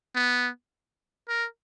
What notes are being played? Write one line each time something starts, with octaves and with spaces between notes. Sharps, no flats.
B3
A#4